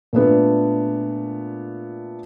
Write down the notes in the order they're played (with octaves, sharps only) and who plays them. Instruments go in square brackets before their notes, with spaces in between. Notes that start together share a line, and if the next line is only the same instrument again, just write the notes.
[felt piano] A#2 A3 B3 D4